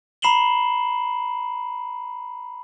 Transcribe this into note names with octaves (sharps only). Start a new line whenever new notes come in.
A#5 B5 C7 E7 F#7 G7